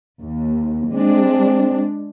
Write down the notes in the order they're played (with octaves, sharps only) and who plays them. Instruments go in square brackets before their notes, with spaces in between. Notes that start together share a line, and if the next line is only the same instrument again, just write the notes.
[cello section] D#2
[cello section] G#3 D4 [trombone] C4